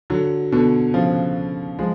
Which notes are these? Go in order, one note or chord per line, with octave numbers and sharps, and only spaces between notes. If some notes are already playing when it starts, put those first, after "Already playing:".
D3 F#3
B2 D3
C#3 F3
F3 G#3